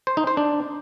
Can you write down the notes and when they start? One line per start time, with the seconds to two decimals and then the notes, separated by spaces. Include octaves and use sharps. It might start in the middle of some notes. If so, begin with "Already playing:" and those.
0.07 C5
0.17 D#4
0.27 C5
0.37 D4